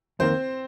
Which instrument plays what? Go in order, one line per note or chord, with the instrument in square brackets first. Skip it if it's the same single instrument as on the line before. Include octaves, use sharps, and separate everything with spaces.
[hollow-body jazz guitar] F2 D#3 A#3 [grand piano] C4 C5